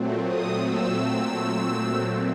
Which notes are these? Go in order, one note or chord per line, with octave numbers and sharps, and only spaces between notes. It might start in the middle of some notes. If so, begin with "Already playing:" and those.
Already playing: A#2 F#3 A3 C4
D#6
E6